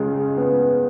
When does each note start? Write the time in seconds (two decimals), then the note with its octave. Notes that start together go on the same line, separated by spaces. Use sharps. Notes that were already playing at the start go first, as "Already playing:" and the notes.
Already playing: C#2 C#3 G#3
0.37 B3